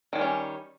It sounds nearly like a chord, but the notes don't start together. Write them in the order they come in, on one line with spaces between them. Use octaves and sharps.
D#3 G#3 G3 C#4